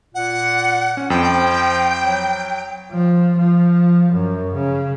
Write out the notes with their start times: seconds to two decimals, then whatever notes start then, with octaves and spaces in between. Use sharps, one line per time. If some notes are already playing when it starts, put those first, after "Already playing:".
0.15 A#2 F#5
0.97 C#4
1.10 F2 F3 G5
2.05 F#3
2.92 F3
3.38 F3
4.12 F#2
4.54 C#3